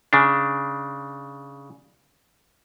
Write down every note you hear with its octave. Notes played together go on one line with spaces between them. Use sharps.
C#3 D4